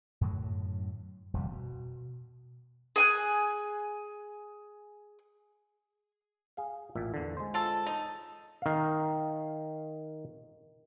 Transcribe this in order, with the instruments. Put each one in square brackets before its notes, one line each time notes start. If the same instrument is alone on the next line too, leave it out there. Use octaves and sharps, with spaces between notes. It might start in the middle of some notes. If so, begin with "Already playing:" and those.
[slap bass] F#2 A2 D3 F#3
D#1 F2 C3 G3
B2
[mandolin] G#4 G#5 F#6
[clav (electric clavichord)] G#4 F5
A1 A#2 E5
E2 D3
G#3 C5
[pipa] F4 A4
D#4
[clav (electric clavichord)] D#3 F5